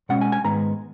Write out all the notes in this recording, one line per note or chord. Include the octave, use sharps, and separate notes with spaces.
B2 G#3 C#4 F#5
G#5
G#5
G#2 D#3 G#3 B3 A#5